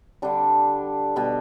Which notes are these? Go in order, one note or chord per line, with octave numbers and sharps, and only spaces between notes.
D3 G3 D4
B2 G3